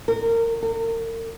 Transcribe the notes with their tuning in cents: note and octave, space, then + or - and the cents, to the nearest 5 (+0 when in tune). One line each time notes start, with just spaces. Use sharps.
A#4 -25
A#4 -40